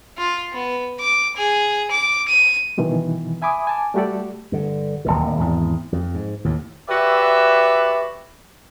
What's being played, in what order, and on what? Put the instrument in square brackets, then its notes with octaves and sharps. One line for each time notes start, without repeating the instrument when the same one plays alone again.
[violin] F4
B3
D6
G#4
D6
D#7
[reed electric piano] G2 B2 D#3 E3
E5 G#5 B5 D6 D#6
G#5 A5 D6
G3 A3 F#4 G4 A4 D5
[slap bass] G2 D3
D1 G1 D#2 D#3
G#1 E2
F2
G#2
D#2 A2
[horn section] F#4 G4 B4 D5 E5